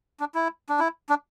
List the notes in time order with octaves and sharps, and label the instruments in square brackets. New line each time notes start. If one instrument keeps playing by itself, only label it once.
[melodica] D4
E4
D4
E4
D4